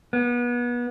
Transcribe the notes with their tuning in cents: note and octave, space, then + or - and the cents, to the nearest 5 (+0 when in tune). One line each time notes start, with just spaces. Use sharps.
B3 -30